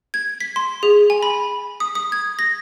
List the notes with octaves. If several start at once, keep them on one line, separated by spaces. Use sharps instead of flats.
G#6
B6
C6
G#4
G#5
B5
D#6
D#6
G#6
A#6